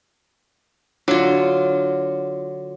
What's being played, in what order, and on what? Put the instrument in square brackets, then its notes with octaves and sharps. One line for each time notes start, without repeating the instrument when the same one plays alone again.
[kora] D3 [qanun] F#3 F4